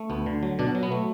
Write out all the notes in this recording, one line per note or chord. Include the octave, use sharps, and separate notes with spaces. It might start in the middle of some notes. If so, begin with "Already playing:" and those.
Already playing: A3
D2 B3
D3
F#3
B2 D4
F#3
B3
A3